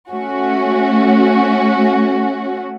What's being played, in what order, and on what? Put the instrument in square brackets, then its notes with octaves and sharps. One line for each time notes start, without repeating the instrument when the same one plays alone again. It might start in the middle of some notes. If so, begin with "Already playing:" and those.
[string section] A3 C#4 F#4